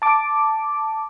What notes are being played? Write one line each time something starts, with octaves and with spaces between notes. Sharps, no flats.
A5 D6